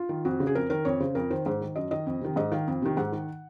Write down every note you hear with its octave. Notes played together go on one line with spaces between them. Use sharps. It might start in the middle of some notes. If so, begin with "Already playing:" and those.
Already playing: F4
D#3
F2 F#4
C#3
G#4
F2 A#4
D#3 A#4
F2 C#5
C#3 C5
F2 A#4
D#3 C5
G#2 C5
D#3
F#2 D#5
D#3 D#5
F2
C3 D#3
G#2 D#5
D#3 F5
F2
C3 D#3
G#2 F#5
D#3